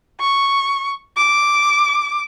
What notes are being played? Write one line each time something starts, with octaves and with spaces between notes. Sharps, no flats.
C#6
D6